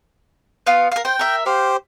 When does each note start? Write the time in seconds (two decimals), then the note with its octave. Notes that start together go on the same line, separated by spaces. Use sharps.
0.66 B3 F4 F5
0.92 A#4 F5
1.05 C5 G5
1.19 A#4 E5
1.46 G4 C5 F5